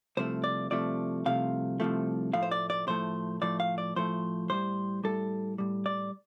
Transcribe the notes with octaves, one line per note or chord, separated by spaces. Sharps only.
C2 C3 F3 A3 C5
D5
C2 C3 F3 A3 D5
C2 C3 F3 A3 F5
C2 C3 F3 A3
A2 F3 A3 F5
C5
D5
D5
A2 F3 A3 C5
A2 F3 A3 D5
F5
D5
A2 F3 A3 C5
A2 G3 C5
A2 G3 A4
A2 G3
D5